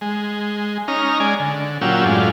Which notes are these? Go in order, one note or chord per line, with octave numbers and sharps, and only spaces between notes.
G#3
C#4 D#4 A#5 F6
G#3 D5 G#5
D3
A#2 F#3 C#4 F4 G4 E6
F#2 A2 G#3 D4 F4